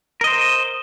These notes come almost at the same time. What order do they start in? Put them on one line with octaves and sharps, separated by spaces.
A#4 D#5 C5